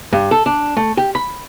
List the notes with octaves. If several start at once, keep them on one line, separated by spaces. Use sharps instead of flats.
G2
A4
D4
A3
G4
B5